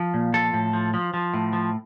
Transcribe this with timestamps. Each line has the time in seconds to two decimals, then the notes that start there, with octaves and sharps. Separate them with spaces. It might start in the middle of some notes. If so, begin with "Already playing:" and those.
Already playing: F3
0.14 A#2
0.34 F3 A4
0.54 A2
0.73 F3
0.94 F3
1.14 F3
1.34 A2
1.53 F3